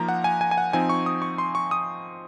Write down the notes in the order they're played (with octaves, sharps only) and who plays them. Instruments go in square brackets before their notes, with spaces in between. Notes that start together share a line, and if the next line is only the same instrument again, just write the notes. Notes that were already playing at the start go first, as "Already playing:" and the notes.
Already playing: [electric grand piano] F3 A#3 D#4 A#5
F#5
G#5
G#5
G#5
F#5
F3 C4 D#4 G#5
C#6
D#6
C#6
C6
C#6
D#6